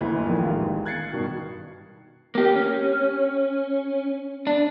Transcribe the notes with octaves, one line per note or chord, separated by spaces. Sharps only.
F#1 D2 E3 B4
A#1 F2 A#2 D#3
A1 D#3 G#3 F4
F#6 G#6 A6 C7 C#7
G2 B2 D#3
A#3 G4
C#4
D4